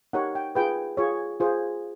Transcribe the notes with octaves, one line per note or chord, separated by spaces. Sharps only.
D#4 G4 A#4 C#5 F#5
G5
F4 G#4 B4 G5
F4 G#4 C#5
F4 G#4 C5